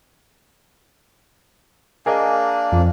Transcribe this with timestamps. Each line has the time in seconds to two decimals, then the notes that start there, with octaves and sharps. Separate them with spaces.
2.06 A#3 D4 G#4 A#4 D#5
2.72 F2